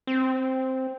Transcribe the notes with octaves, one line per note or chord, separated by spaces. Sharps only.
C4